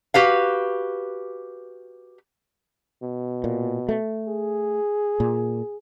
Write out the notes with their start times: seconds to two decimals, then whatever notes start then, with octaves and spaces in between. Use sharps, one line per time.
0.14 F#4 G4 B4 F5
3.03 B2
3.44 A#2
3.89 A3
4.28 G#4
5.20 A#2